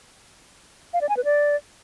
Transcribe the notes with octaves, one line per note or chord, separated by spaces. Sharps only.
F5
D5
G#5
B4
D5